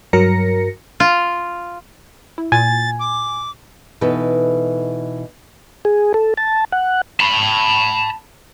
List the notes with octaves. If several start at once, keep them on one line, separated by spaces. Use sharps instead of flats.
G2 F#3 A#4 A#6 C#7
F4
E4
A#2 G#5 A6
D6
B2 E3 D#4 A4 B4
G#4
A4
A5
F#5
A5 B5